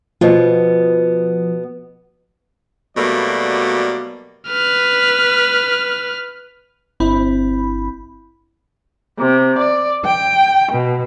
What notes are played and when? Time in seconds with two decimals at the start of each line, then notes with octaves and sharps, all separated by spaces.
0.21 B2 F3 B3
2.97 B2 F#3 G3 A3 A#3 D5
4.49 B4 F6
7.00 G1 C4 E4 B5
9.19 C3
9.59 D5
10.04 G5
10.72 B2